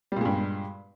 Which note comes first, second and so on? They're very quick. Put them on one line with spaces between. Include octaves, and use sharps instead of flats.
G3 A#2 G#3 G2